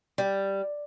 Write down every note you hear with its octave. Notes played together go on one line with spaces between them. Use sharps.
G3